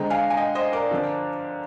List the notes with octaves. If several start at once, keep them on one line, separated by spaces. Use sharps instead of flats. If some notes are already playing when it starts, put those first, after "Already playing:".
Already playing: D3 G#3 C4 G5 A#5
F5 G#5
G#5
D#5 G5
C5 D#5
A#4 D5
D3 F3 C4